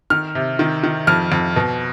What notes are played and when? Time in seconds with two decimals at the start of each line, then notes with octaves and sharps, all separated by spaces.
0.10 D#3 F6
0.35 C3
0.59 D#3
0.84 D#3
1.07 F2 F6
1.32 F2
1.56 B2